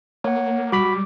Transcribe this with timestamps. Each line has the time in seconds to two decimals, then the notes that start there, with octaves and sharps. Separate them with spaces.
0.24 A#3 C#5 F#5
0.72 G3 F#4 B5 D6 B6